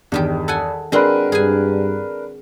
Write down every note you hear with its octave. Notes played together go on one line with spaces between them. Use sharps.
E2 G2 D#3 G4
A4 F#5 G#5
G#3 C4 D4 F#4 A#4 B4
G2 G#4 G#5